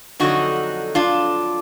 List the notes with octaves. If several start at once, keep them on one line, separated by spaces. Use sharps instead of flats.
F2 D3 F#3 D#4 F#4
D4 F4